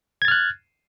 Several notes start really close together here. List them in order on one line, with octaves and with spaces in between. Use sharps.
G#6 A6 F6 F#6